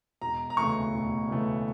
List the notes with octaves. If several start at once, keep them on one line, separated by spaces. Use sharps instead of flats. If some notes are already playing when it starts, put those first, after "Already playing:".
E1 A#5
A#5
D2 C#3 E3 A3 C#6
E1
D2 C#3 E3 A3